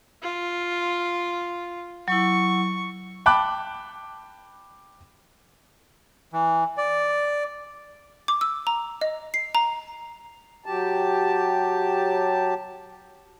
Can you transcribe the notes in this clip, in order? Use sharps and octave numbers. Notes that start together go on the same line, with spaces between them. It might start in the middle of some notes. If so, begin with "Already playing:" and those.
F4
F#3 E4 C#6
G5 A5 B5 D6 F#6
E3
D5
D6
E6
A#5
D#5
C7
A#5
F#3 G4 A5